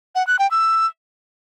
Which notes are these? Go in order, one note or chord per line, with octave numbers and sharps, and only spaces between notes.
F#5
F#6
G5
E6